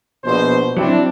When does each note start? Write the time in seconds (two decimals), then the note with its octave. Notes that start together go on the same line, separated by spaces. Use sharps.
0.24 A#1 B2 C5
0.77 F#3 C4 D4 E4